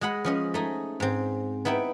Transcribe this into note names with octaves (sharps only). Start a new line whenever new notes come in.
G#3 D#5 F#5 B5
F3 C#4 D#5
A3 D#4 G#4
G#2 C4
B3 D#4 E4 E5 G5